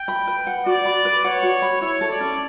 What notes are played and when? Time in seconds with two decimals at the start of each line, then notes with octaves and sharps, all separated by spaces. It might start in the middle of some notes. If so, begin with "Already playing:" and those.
Already playing: G5
0.08 B5
0.27 B4
0.47 F#5
0.66 F#4 D5
0.85 B5
1.05 B4
1.24 C#5 F#5
1.43 F#4
1.62 B5
1.81 E4 C#5
2.01 A4
2.11 D5
2.20 C#4